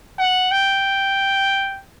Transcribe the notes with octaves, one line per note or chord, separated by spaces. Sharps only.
F#5
G5